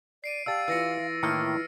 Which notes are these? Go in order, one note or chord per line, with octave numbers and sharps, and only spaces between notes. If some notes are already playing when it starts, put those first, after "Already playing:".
D5 C7 D7 D#7
G4 D5 F5 A5 E6 A6
E3 F4 E6 A#6 C#7
A2 D#3 A#3 E4 F6 C#7